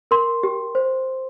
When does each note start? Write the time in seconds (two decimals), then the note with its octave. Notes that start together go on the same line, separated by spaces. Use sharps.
0.11 A#4 C6
0.43 G4
0.75 C5